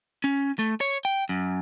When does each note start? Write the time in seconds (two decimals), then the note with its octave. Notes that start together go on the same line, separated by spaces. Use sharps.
0.24 C#4
0.59 A3
0.81 C#5
1.05 G5
1.29 F#2